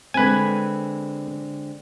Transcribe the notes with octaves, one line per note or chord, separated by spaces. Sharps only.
D3 G#3 C4 B4 G#5